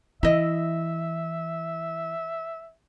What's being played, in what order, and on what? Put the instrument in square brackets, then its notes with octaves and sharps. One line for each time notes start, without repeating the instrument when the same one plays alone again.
[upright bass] E3 [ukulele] E4 D#5 [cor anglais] E5